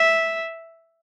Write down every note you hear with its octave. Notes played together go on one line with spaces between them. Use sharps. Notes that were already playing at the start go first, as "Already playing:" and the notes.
Already playing: E5